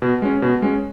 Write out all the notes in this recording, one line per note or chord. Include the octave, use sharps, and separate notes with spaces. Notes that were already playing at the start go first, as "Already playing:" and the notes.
B2
G#3 C#4
B2
G#3 C#4